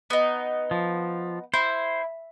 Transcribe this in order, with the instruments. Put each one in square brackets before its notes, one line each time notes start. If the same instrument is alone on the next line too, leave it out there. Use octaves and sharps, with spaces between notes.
[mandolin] B3 D#4
[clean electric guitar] F3
[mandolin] E4 [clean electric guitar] C5